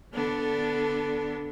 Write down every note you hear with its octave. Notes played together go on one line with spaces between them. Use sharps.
D3 B3 D4 A4